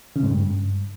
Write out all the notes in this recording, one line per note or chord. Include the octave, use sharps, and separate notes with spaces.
C#3
G#2
G2